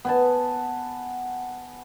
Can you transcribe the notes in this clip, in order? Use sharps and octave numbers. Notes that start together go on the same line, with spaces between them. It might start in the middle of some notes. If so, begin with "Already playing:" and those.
B3 G#5 A5